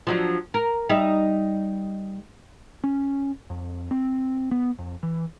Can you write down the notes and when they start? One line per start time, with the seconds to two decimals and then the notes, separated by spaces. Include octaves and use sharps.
0.07 F3 F#3 D4
0.54 A#4
0.89 G3 D#4 E5
2.84 C#4
3.50 F2
3.91 C4
4.51 B3
4.79 F2
5.03 E3